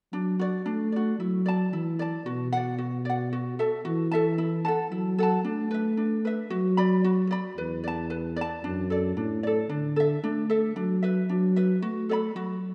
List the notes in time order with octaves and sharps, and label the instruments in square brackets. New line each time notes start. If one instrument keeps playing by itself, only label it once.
[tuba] F#3 [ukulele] D4
[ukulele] F#4 D5
[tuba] A3 [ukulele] D4
[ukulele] F#4 D5
[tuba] F#3 [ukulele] E4
[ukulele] D5 A5
[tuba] E3 [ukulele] E4
[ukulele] D5 A5
[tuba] B2 [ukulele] F#4
[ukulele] D5 F#5
F#4
D5 F#5
F#4
A4 E5 A5
[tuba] E3 [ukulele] F#4
[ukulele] A4 E5 A5
E4
A4 F#5 A5
[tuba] F#3 [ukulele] E4
[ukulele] A4 F#5 A5
[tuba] A3 [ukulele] D4
[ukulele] B4 E5
D4
B4 E5
[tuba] F#3 [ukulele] F#4
[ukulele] D5 B5
F#4
D5 B5
[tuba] E2 [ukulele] B4
[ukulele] D5 A5
B4
D5 A5
[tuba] F#2 [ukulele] D4
[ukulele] A4 D5
[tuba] A2 [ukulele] D4
[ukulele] A4 D5
[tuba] D3 [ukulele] D4
[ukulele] A4 E5
[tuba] A3 [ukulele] D4
[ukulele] A4 E5
[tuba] F#3 [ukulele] D4
[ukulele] B4 E5
[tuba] F#3 [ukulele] D4
[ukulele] B4 E5
[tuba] A3 [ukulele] F#4
[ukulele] A4 D5 B5
[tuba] F#3 [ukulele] F#4